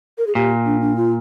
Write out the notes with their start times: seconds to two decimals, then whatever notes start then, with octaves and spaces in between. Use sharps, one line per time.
0.18 A#4
0.27 G#4
0.35 A#2 G4
0.65 D4
0.81 D4
0.96 F4